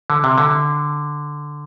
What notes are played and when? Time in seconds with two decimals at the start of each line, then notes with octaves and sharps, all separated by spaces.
0.10 D3
0.24 C3
0.38 D3